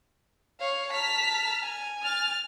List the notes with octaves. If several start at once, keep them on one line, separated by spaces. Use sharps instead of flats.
C#5 F5
A5 A#5 F6 B6
G#5
F6 A6